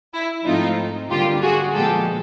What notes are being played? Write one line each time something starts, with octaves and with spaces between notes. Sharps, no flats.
E4
G#2 F3 A3 C4 D#4 F4
F#2 D3 G3 A#3 F4 G4
F#4 G#4
A#2 F3 G#3 B3 G4 A4